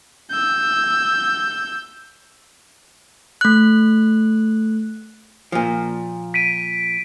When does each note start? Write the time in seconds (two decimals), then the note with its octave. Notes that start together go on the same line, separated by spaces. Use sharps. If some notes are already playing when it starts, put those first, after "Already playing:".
0.31 E6 G6
3.41 A3 F#6
5.52 A#2 F3
6.34 B6 D7 D#7